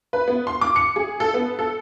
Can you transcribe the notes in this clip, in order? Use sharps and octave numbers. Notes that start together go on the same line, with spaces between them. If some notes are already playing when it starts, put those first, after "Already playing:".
B4
B3
C6
D6
C#7
G#4
A4
B3
A4